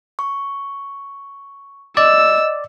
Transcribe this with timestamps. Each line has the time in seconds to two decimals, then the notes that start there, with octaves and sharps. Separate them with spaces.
0.19 C#6
1.97 D5 D#5 E6